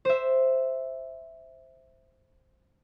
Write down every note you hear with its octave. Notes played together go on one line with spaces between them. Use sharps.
C5 E5